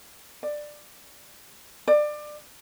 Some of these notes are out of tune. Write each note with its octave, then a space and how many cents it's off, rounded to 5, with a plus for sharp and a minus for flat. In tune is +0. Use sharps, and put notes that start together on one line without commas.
D5 +15
D5 +25